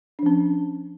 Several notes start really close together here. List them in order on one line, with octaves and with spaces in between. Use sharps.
D4 F3 C#4